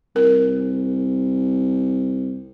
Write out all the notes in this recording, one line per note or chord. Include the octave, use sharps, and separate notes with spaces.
C2 A#4